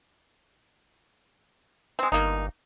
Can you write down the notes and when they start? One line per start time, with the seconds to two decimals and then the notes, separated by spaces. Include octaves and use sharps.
1.99 G#3 C4
2.12 G1 A#3 D#4